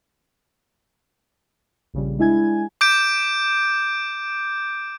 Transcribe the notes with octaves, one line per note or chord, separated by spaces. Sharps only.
A#1 C#3 G3
G#3 D4 E4 G#5 G#6
D6 G6 D7